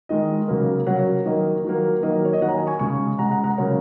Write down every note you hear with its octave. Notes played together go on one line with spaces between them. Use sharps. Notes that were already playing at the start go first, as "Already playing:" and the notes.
D#3 G#3 D#5
C#3 F#3 A#3
C#3 F#3 A#3 C#5 F#5
D#3 F#3 A#3 D#5
D#3 F#3 A#3
D#3 F#3 A#3 D#5
C#5
D#5
D#3 F#3 A#3 C#5 F#5
A#5
D#5 G#5
G#5 C#6
C#3 G#3 G#5 C#6
C#3 G#3 F#5 A#5
F#5 A#5
F#5 A#5
C#3 F#3 A#3 C#5 F#5